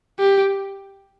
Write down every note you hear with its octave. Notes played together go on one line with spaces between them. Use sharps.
G4